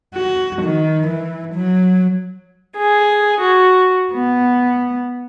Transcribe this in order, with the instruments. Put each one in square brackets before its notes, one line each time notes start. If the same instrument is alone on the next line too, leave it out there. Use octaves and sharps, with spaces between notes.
[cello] F#4
D#3
E3
F#3
[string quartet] G#4
F#4
B3